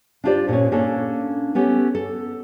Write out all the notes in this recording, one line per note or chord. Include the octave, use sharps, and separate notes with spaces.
D4 E4 F4 G4 C5 D5
A#2 C#4
A#3 C#4 D4 A4
B3 C#4 G4 A4
A4